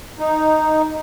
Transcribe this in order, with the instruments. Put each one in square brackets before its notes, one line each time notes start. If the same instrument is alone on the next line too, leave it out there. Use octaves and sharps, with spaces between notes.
[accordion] D#4